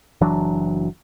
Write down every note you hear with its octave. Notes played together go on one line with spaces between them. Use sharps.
F#1 E3 F#3 D4